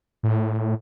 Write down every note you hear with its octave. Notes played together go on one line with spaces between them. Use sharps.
A2